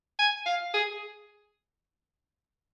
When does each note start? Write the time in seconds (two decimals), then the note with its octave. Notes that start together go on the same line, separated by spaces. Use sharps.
0.19 G#5
0.46 F5
0.73 G#4